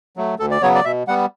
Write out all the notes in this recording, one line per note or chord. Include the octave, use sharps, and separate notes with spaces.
F#3 A3
D2 A4
D5
C#3 F#3 B3 C#5
D5
B2 E5
G3 B3 F#5